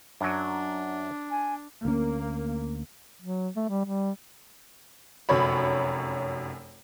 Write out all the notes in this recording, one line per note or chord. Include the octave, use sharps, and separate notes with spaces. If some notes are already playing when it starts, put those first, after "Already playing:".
F#2 F#3 D4
G#5
D2 A#3 C#4
F#3
A3
G3
G3
F1 F#2 C#5 B5